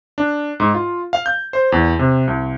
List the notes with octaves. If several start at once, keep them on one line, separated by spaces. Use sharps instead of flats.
D4
G#2
F4
F5
G6
C5
E2
C3
C2